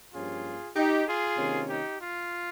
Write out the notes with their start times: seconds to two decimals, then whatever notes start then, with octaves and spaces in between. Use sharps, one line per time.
0.13 G2 F3 A#3 C#4 F4 G#4
0.76 D#4 G4
1.07 F4 G#4
1.37 C3 D#3 A#3 C#4
1.68 D#4 G4
2.00 F4